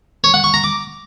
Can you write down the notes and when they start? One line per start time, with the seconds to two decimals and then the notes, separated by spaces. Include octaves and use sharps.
0.24 C#5
0.34 F#5
0.44 C#6
0.54 A#5
0.64 D6